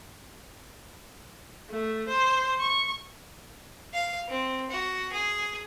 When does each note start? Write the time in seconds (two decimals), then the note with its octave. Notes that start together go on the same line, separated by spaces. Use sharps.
1.70 A3
2.09 C5
2.60 C#6
3.94 F5
4.28 C4
4.70 F#4
5.12 G#4